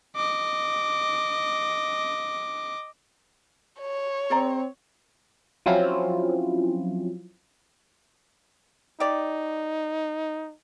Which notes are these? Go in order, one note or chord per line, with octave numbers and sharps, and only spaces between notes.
D#5 D6
C#5
C4 G#4 D5 A#5
F3 F#3 C4 C#4 E4 F4
D#4 G4 D5